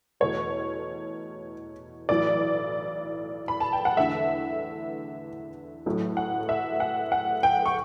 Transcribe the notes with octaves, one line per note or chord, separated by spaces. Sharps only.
E2 B2 A3 C#5
B1 A2 E3 D5
B5
A5
G5
F#5
E2 D3 A3 E5
A1 A2 F#3 A3
F#5
E5
F#5
F#5
G5
C#6